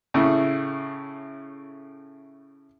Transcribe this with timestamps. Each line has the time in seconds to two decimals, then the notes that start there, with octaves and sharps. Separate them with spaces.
0.14 A2 C#3 A3